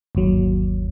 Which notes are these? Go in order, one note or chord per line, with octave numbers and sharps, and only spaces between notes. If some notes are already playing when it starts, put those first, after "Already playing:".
G1 D#2 F#3